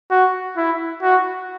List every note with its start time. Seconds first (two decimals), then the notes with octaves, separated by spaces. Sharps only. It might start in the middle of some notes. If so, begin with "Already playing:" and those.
0.11 F#4
0.57 E4
1.03 F#4